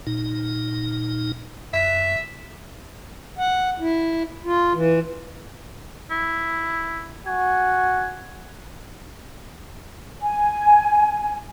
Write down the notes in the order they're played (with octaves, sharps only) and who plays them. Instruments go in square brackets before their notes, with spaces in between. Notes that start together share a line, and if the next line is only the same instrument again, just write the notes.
[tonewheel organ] A#2 D#4
[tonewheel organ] F#2 [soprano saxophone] E5
[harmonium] F#5
E4
F4
E3
[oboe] E4
[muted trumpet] F#4 [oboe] G#5
[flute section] G#5